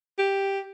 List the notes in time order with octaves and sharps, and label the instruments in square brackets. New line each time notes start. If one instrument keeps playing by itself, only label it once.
[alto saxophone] G4